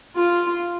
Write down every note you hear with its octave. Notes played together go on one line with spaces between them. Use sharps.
F4